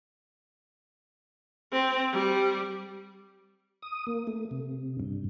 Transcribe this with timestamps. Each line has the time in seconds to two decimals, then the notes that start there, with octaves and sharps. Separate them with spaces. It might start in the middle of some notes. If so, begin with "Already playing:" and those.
1.72 C4
2.12 G3
3.82 D#6
4.07 A#3
4.27 A3
4.51 C3
5.00 G2